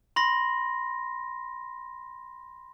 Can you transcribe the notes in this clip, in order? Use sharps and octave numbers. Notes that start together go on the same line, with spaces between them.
B5 C6 A#6